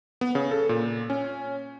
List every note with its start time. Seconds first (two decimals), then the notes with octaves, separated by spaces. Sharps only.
0.21 B3
0.35 C#3
0.51 A4
0.69 A#2
1.10 C#4